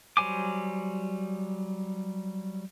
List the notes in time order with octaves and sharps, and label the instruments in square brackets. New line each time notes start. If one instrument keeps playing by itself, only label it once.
[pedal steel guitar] F#3 G3 C5 G#5 D6